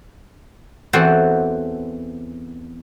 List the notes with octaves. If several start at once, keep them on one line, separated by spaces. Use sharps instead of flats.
E2 E3 C4 F#4 A4 C5